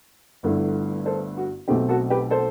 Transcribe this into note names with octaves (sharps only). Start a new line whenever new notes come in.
G1 G2 D3 A3 E4
A4 C5
F#4
B1 B2 A3 C4 G4
F#4 A4
G4 B4
A4 C5